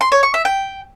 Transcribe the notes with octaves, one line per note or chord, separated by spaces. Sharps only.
C6
C#5
C#6
E5
G5